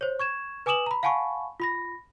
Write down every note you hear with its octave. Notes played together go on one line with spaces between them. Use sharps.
C5 C#5
C#6 G#6 E7
B4 G#5 D6 D#6 E7 F#7
A#5 B5
F5 F#5 G#5 A5 B5 C#6
F4 B5 A#6